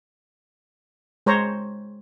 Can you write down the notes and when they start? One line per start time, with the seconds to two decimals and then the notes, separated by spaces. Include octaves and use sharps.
1.26 G#3 C5 C#5 A#5